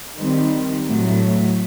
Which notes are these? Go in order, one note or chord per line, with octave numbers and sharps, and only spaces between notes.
D#3 G3 C4
A2 F#3 A3